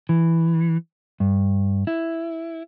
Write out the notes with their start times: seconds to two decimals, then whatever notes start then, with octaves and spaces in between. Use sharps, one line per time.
0.09 E3
1.20 G2
1.87 E4